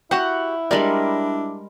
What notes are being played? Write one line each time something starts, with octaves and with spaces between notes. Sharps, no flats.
E4 F#4 G4 F#5
G3 G#3 D4 A#4 D5 B5